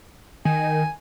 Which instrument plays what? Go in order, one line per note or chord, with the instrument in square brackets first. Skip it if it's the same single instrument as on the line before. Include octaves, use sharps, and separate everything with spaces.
[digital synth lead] D#3 [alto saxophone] G#5